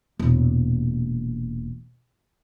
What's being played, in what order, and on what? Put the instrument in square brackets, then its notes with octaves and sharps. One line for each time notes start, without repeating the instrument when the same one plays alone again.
[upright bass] E1 A#2